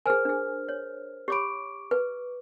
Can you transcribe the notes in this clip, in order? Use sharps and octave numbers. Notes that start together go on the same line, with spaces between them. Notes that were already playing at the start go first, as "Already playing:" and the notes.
G#4 A#4 C5 G#5 F6
D4 G#4
C#5
G4 C#5 B5 C#6 D6 D7
B4